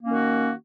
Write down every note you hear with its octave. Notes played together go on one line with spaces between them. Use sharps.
D#3 A#3 C#4 F#4